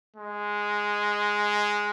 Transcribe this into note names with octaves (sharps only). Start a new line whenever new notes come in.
G#3